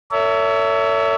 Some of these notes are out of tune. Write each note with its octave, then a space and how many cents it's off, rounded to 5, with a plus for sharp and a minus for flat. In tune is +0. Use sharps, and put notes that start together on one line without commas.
A4 +45 C#5 +35 E5 +0